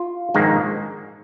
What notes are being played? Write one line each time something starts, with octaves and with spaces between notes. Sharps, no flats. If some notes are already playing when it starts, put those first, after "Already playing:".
Already playing: F4
A#1 G#2 D#3 A#3